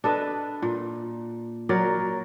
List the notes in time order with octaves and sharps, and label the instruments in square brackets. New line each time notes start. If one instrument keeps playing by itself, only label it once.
[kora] D4 A4 B4 D#5
A#2
F#3 A#4 D5